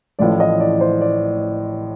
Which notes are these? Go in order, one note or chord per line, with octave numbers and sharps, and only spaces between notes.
A1 A2 F3 D5
D#5
D5
C5
D5